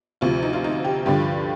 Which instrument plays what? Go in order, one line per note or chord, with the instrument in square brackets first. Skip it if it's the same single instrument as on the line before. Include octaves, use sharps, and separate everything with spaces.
[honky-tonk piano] D2 C3 F3 F4
D#4
F4
D#4
G4
G2 D3 F3 G4